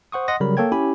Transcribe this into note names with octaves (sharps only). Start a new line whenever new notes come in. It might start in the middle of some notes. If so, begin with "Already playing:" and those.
C5 F#5 C#6 D#6
D#5 F#5 C6 D#6 A#6
C#3 F#3 G3 A#4 B5
A#3 A4 C#5 G5 G#6
C#4 E4 G4 G#5 B5